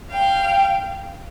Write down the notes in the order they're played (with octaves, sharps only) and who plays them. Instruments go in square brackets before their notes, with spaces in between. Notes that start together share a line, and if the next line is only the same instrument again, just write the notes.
[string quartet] F5 G5